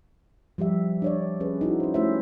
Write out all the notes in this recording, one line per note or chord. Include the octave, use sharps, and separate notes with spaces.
F3 G3 G4 E5
D4 C#5 D5
C#4 G#4 B4
D#4 E4 F#4
C#4 C5
A3 C#4 E4 G4 C5 E5